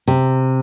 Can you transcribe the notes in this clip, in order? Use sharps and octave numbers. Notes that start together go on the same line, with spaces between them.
C3